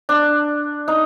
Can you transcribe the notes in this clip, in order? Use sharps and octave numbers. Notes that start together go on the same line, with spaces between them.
D4
D#4